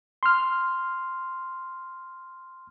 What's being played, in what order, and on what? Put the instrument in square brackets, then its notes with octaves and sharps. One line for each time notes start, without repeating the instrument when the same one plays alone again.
[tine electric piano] C6 F6